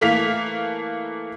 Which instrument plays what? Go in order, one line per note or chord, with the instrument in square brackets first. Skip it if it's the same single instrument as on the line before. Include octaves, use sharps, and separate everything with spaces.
[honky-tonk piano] E3 A3 A#3 F5 B6 F7